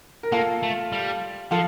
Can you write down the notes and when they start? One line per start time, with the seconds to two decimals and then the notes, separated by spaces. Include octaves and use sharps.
0.23 A#4
0.32 A#3 F4 A4
0.63 A3
0.92 G3
1.51 F3 F4 A4